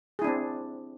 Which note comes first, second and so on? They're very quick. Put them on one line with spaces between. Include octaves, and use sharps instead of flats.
G#4 E4 D4 C4